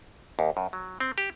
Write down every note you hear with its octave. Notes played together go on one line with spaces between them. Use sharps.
D#2
F#2
F#3
C4
G4